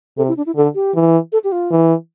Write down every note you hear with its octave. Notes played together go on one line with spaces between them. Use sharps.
C3 A4
E4
D4
E4
D3 A4
G4
E3
A4
G4
F4
E3